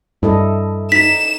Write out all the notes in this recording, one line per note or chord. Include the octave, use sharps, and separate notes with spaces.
G2 E4 A4 D#5
D#4 B6 E7